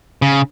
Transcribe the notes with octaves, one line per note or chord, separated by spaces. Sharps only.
C#3